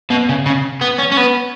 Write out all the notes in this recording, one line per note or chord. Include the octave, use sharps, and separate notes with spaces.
B2
C#3
C#3
B3
C#4
C#4
B3